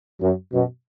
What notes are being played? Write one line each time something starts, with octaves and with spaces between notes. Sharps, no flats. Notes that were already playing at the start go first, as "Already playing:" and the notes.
F#2
F#2 B2